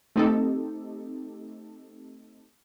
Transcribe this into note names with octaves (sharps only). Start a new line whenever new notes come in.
A3 C4 D#4 G4 A4